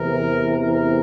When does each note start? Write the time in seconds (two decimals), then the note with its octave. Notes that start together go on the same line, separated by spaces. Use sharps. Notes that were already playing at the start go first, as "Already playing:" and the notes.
Already playing: E2 C3 E3 A#4
0.52 A#4